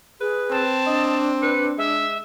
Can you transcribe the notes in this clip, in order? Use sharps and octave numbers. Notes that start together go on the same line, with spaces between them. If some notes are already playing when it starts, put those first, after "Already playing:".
G#4 B4
C4 A5
D4 D#5
B4 C#7
G#3 E5